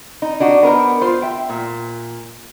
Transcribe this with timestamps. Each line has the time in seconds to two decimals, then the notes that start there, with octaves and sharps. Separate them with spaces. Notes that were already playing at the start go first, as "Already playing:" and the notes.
0.22 D#4
0.40 D4 D#4 F#4
0.63 B3 A#4 C5
1.01 F4 C5
1.22 E5 G5
1.50 A#2